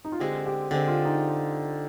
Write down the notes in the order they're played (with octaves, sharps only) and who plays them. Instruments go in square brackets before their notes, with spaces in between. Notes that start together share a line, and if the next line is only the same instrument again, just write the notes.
[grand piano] D#4
F4
[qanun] D3 G#3 C4 [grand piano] G4
[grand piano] G4
[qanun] D3 G#3 C4 [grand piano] G4
[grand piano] F4
D#4